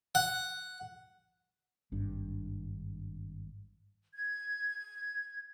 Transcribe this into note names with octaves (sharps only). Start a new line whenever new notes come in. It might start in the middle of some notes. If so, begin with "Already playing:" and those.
F#5
G#1 G2 D4
G#6